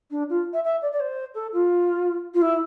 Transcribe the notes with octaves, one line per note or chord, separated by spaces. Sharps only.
D4
F4
E5
E5
D5
D5
C5
A4
F4
F4
E4